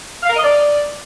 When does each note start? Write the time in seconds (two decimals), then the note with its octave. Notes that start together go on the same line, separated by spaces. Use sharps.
0.23 F5
0.30 A#4
0.36 D#5
0.43 D5